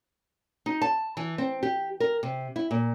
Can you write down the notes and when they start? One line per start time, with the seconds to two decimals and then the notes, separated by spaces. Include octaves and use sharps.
0.66 D#4
0.82 A5
1.17 E3
1.38 C4
1.63 G4
2.00 A#4
2.23 C3
2.56 E4
2.71 A#2